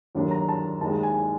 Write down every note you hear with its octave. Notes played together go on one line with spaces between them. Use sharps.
D#2 D3 F#3 A#3 D4
A#5
A5
D#2 D#3 G#3 A5
A5
G#5
G#5